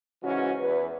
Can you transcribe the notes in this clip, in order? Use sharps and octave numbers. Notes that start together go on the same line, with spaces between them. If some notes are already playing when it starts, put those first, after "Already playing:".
G#2 C#3 E3 C#4 F#4
E2 B4